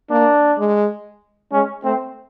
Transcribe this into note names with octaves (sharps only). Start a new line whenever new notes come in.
A#3 D4
G#3
G#3 C#4
A3 C4